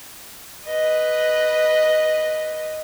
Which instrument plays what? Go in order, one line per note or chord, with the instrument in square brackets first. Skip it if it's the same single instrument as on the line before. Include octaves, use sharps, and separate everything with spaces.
[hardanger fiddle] B4 D#5